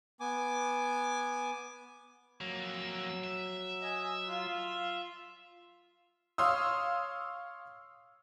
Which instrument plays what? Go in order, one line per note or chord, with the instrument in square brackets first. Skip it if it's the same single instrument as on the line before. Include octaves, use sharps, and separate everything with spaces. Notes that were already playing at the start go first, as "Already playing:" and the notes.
[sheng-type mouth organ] B3 G#5 D6
[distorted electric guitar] F2 A#3 [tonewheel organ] F#3 E6
[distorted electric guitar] E5
[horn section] D#5 G#5
F4
[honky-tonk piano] C#5 F5 C6 D#6 E6